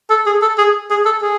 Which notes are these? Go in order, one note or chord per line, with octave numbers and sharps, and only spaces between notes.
A4
G#4
A4
G#4
G#4
A4
G#4